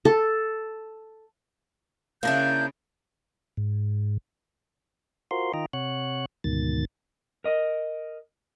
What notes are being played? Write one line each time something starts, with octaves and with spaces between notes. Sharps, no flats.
A4
C#3 A#3 D4 E4 G6
G#2
F4 F#4 A#4 C5 C6
D#3 F4 D#5 G5 A#5
C3 C#5 F#5 F#6
D2 G#2 B2 D#3 A6
A#4 D#5